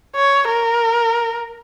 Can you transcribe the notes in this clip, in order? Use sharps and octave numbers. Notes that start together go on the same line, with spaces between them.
C#5
A#4